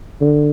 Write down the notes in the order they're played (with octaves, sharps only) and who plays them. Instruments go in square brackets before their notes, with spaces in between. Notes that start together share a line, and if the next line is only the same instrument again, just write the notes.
[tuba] D3